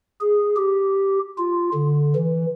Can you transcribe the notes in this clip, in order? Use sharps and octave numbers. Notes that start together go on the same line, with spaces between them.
G#4
G4
F4
D3
E3